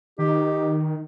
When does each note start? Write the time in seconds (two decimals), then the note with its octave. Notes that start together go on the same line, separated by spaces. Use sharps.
0.19 D#3 D#4 G4